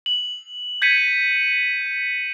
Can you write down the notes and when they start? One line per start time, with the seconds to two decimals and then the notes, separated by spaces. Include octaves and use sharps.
0.06 F#7
0.82 G6 G#6 B6 C#7 D#7